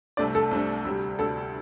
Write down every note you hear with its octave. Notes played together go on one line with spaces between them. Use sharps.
C2 C3 A3 D4 D5
A4
C2 C3 A3 D4
D2 C3 G3
D2 C3 G3 A4